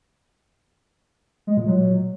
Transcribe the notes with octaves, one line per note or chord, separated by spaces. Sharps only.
G#3
A#2
F#3